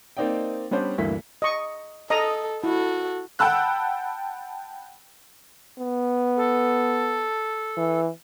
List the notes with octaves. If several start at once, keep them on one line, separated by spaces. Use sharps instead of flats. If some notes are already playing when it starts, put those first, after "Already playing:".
A#3 C4 D#4 D5 D#5 G5
G3 B3 C#4 D4 C5
D2 G2 E3 A#3 B6
D#5 C#6
A4 D#5 A#5 D#6
E4 F#4 A4
F#5 G5 A5 B5 E6 F#6
B3
A4
E3